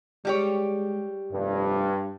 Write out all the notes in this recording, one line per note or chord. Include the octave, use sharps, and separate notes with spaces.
G3 G#3 G4 C#5
F1 G2